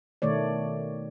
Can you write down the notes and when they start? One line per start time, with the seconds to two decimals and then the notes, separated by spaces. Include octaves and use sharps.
0.22 B2 D#3 A3 C#5 D5